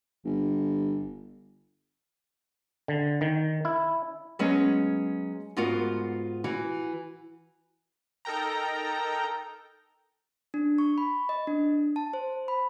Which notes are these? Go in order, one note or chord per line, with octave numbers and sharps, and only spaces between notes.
G1
D3
D#3
E4
F#3 G#3 B3 C#4 G#4
G#2 B3 F4 F#4 A#4 F#5
E3 F#4
D#4 A4 A#4 G5 A#5
D4
C#6
B5
D#5
D4
A5
C5
B5